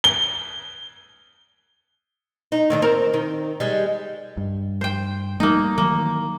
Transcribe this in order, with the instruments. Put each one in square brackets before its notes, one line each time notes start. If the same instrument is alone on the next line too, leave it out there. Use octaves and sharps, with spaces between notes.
[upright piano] G7
[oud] D#4
A2 D#3 D4
C4 A#4
D#3
G3 G#3
[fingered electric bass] G2
[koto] C5 G5
[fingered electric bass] G3 A3 [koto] A#3 D#4
[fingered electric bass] D#3 E3 F#3 [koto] A#3